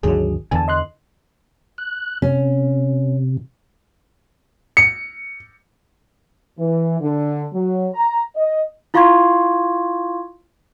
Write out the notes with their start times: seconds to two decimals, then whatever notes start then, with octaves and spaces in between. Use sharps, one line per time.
0.03 G#1 D#2 D3 F#3 G#4
0.51 E2 D3 E3 G#5 A5
0.68 D#5 C6 F#6
1.78 F#6
2.22 C3 C#4
4.77 C#7
6.59 E3
7.01 D3
7.53 F#3
7.94 A#5
8.36 D#5
8.94 E4 F4 F5 C6 C#6 G#6